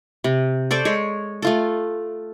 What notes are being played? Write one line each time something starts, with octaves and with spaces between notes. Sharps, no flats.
C3
A4 C5 D5 C#6
G#3 C#5
A3 F4 A4